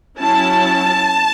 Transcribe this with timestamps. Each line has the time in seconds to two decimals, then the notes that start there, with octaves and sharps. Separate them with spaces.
0.19 F#3 C#4 E4 A5